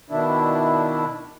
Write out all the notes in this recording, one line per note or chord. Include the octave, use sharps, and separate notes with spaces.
B2 D#3 D4 E4